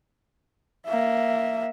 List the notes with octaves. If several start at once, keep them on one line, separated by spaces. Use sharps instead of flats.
A#3 E5